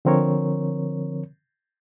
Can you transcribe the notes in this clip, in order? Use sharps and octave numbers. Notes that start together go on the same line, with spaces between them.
D3 F3 C4 A#4 C#5